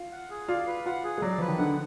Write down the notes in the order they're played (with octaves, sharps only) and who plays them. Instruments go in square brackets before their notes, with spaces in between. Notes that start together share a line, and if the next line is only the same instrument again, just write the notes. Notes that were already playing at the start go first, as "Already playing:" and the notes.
Already playing: [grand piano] F4
[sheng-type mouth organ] F#5
G#4
[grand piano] F4 [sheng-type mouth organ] D5
[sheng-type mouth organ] B4
[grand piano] F4 [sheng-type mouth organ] F#5
[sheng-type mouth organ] G#4
[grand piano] G#3
[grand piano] F#3 [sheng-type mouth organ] D5
[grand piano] F3 [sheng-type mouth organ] B4
[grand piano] D#3
[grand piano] D3 [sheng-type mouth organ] F#5